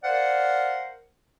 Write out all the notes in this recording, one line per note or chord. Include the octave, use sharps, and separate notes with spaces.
A#4 C5 D5 F5 F#5